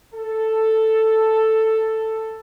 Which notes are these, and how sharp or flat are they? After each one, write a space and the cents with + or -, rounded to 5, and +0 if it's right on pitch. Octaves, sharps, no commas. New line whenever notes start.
A4 +5